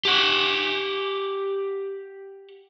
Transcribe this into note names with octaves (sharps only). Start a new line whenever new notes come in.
G4 F#5